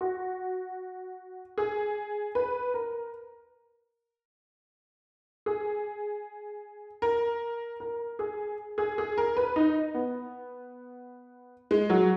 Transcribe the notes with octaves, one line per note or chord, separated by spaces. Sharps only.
F#4
G#4
B4
A#4
G#4
A#4
A#4
G#4
G#4
G#4
A#4
B4
D#4
B3
G#3
F#3